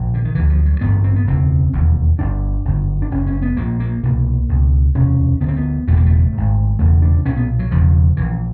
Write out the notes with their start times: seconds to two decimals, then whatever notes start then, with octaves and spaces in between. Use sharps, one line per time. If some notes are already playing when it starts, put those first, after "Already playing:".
Already playing: A#1 A#2
0.14 D3
0.24 D#3
0.35 D2 D3 E3
0.50 F3
0.66 F#3
0.81 A1 G2 D3 B3
1.04 C4
1.16 B3
1.27 E1 D2 C#3 C4
1.73 E1 D#2 D3
2.18 G1 G2 D3 D4
2.65 G1 F#2 D3
3.02 D4
3.11 F#1 F#2 C#3 C#4
3.27 C#4
3.42 B3
3.57 A#1 A#2 A#3
3.80 A#3
4.03 C2 B2 A#3
4.49 C#2 B2
4.95 E1 D2 C3 C#4
5.41 D2 D3 B3
5.48 C4
5.56 B3
5.87 F#1 E2 B2 A3
5.96 A#3
6.06 A3
6.33 G#1 G#2
6.79 E1 E2 C#3 A3
7.02 D4
7.25 B1 A#2 C#4
7.37 B3
7.59 F#3
7.71 E1 E2 C#3 F3
8.17 A#1 A#2 E3